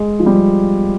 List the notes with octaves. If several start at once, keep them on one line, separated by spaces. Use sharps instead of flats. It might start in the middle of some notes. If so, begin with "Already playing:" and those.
Already playing: G#3
F3
G3